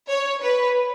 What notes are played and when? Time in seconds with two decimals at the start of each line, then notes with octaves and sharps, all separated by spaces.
0.10 C#5
0.42 B4